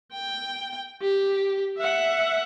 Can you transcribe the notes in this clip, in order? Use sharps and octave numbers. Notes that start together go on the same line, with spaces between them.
G5
G4
E5 F#5